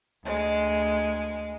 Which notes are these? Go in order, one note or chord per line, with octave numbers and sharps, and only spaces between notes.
D2 G#3